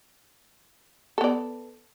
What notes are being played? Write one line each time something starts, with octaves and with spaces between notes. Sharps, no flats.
B3 A4 D5